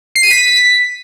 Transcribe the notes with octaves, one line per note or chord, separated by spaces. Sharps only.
C7
D#7
B6